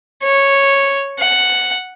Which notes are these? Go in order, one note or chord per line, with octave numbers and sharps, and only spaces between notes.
C#5
F#5